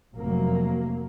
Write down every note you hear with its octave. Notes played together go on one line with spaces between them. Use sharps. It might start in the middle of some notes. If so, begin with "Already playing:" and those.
F1 F2 F#3 A#3